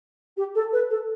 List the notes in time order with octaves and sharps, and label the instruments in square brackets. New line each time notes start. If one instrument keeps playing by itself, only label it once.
[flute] G4
A4
B4
A4